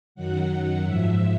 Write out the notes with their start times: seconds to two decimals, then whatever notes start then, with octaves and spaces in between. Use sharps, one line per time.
0.15 F#2 D#3 F#3 F#5
0.83 G#2 F3 E5